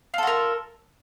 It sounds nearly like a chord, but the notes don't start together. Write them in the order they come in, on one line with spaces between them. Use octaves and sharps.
F4 A4 F#4 A#4